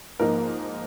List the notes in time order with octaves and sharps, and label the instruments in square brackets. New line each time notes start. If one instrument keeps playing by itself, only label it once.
[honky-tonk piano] G#2 F3 A#3 D#4 [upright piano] A#4